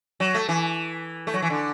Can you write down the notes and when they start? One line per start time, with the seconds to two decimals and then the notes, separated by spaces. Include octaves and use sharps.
0.20 F#3
0.34 A3
0.49 E3
1.27 A3
1.34 F#3
1.42 E3
1.50 D3